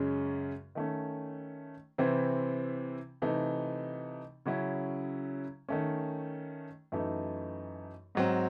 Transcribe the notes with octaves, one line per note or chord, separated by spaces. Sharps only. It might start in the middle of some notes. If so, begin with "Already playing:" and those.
Already playing: F#2 C#3 G#3 C#4
D#3 A3 C#4
C3 E3 C4 E4
C3 E3 A3 D#4
C#3 F#3 C#4 E4
D#3 A3 C#4
F#2 E3 A3 D#4
G#2 F#3 C4